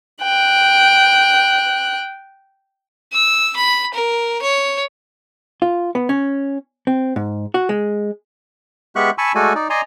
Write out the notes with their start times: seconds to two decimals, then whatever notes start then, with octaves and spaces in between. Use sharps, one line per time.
0.22 G5 F#6
3.12 E6
3.56 B5
3.94 A#4
4.42 C#5
5.62 F4
5.95 B3
6.09 C#4
6.87 C4
7.16 G#2
7.54 F#4
7.69 G#3
8.96 G#3 B3 G4 E5 C#6 F#6
9.18 G#5 A5 B5 C#6 E6
9.35 G#3 A3 F#4 A4 D5 G#5
9.55 D#4 D5
9.70 D5 D#5 G#5 A#5 C6